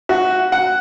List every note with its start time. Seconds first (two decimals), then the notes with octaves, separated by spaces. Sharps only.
0.09 F#4
0.52 F#5